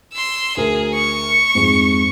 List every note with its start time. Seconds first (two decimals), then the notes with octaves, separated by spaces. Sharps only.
0.13 C6 E6
0.57 D2 G#4 A#4
0.94 C#6
1.55 F2 G#2 G#3